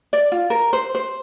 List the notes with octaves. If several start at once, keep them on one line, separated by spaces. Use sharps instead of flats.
D5
F4
A#4
C5
C5